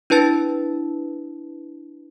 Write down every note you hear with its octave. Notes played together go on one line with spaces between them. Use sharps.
D4 E4 B4 A5 A6